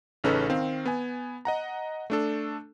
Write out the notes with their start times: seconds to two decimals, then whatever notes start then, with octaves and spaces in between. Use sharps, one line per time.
0.24 A1 C#3 C#4 D#4 A4 B4
0.50 D#3 C4 F5
0.86 B3 G#5
1.45 D#5 F#5 A#5
2.10 A3 D4 A4